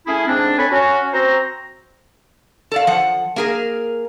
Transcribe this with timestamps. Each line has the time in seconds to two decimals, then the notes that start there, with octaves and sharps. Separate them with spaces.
0.07 A3 C#4 E4 G#4
0.27 G#2 C4 D4
0.58 A4 C#5 G#5 A5 B5
0.71 C#4 F#4
1.13 C4 F#4 C5 A#5
2.72 A4 D5 F5
2.87 F3 F#5
3.36 A#3 G#4 A#4